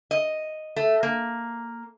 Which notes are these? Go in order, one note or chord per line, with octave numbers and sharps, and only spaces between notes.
D#5
A3
A#3